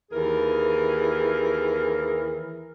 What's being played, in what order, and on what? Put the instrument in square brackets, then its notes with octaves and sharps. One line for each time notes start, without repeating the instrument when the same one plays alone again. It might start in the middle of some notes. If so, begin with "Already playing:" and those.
[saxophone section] D#2 E3 G#4 A#4